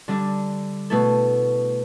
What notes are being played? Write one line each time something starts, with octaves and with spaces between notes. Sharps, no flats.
D3 G3 D4
B2 A3 E4 A4